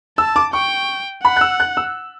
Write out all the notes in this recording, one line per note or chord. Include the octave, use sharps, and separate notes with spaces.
A5 E6
D6
G5 C#6
F#5 B5
F#6
E6
F#6
E6